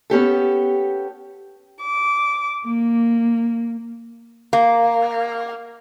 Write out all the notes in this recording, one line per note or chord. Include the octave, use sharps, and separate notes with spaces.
B3 C#4 G4 A4
D6
A#3
A#3